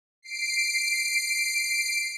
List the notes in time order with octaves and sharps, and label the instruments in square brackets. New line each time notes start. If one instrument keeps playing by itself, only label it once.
[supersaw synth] C7 D7